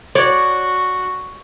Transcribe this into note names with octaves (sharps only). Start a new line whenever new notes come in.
F#4 C#5 D5